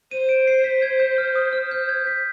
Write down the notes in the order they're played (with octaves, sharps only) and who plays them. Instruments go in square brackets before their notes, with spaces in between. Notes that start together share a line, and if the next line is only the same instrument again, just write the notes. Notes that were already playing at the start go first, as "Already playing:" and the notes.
[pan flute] C5 [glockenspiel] D#7
[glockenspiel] D7
C7
B6
G#6
G6
F6
D#6
F6
G6
G#6
B6